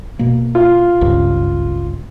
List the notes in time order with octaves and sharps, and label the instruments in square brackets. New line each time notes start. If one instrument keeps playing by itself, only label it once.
[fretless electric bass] B2 A#3
[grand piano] F4
[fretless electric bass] G#1 C#2 G2